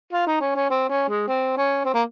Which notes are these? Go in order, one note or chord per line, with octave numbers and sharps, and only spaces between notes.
F4
D#4
C#4
C#4
C4
C#4
G#3
C4
C#4
C4
A#3